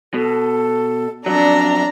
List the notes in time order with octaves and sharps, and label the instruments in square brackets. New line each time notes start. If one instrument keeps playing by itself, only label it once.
[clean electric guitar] B2 [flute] A4
[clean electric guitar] F2 G#2 F#3 [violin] D4 A#5 [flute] D5